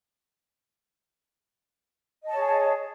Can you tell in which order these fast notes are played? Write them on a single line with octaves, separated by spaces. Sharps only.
D#5 A5 C#5 G#4